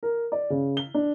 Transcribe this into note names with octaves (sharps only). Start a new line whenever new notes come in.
A#4
D5
C#3
G7
D4